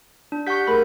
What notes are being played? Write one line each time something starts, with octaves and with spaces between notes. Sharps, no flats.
D4
G4 F#5 C#6 G6 B6
A3 G#4 A#4 B5